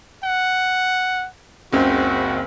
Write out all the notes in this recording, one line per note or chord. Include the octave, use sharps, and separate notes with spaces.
F#5
F#1 C#2 C4 F#4